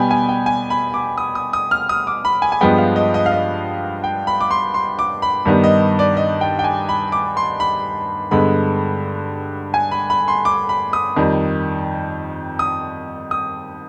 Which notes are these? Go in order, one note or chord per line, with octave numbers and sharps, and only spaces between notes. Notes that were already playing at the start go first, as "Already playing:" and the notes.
Already playing: B2 G3 B3 G5 G#5 B5
G#5
G5
G#5
B5
D6
D#6
D#6
D#6
F6
D#6
D6
B5
G#5
G#5
G2 F3 G#3 B3 G5
F5
D#5
D#5
F5
D#5
G5
B5
D6
C6
C6
D6
B5
G2 D#3 G3 B3
D#5
D5
D#5
G5
G5
G#5
B5
D6
C6
B5
G2 D3 G#3 B3 B5
G#5
B5
B5
C6
D6
B5
D#6
F2 D#3 G3
D#6
D#6